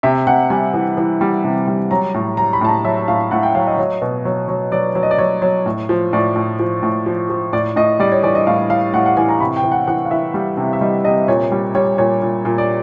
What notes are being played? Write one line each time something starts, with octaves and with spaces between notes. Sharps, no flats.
C3 E5
C3 F#5
G3 G#5
E3
E3
G3
C3
G3
F#3 A#5
A2
F#3 A#5
B5
A2 A5
A#5
F#3 E5
A2 F5
A2 F#5
G5
F#3 F5
D#5
F#3
B2
F#3
F#3
F#3 D5
F#3
D#5
D5
F#3 C#5
F#3
A2
F3
A2 D5
A2
F3
A2
F3
F3
A2 D5
A2 D#5
G3 D5
C#5
E3 D5
D#5
A2 F5
E3 F5
A2 F#5
F#5
E3 G#5
A#5
C3 B5
G5
E3
F#5
E3 F#5
F5
E3 E5
G3
C3
E5
G3 D#5
C3 D#5
A#2 C#5
G3
G3 C#5
A#2 C#5
A#2
A#2
D5